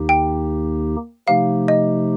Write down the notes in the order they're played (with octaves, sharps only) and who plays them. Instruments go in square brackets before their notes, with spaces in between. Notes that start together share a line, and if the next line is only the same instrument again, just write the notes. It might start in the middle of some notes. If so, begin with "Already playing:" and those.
Already playing: [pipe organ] D#2 D#3 A#3 D#4 G4
[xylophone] G5
[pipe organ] C3 F3 A3 D#4 G4 [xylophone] F5
[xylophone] D#5